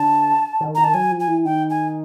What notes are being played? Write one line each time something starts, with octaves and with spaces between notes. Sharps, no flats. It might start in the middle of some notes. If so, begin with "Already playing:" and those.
Already playing: D3 A5
D#3
D#3 A#5
A5
F#3 G#5
F3
G#5
E3
D#3 G5
G#5